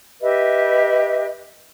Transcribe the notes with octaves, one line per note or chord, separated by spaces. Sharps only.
G4 B4 D#5 E5